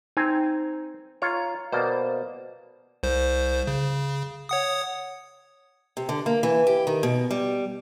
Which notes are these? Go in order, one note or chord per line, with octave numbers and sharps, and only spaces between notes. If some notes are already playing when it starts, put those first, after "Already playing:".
C4 D#4 G#5
F4 C#5 A#5
B2 A#3 C5 D5
C2 C5
C#3
C#5 F#5 D#6
C3
D3
A#3
E3
G4
D#3
B2
G3